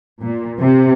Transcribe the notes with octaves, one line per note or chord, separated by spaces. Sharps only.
A#2
C3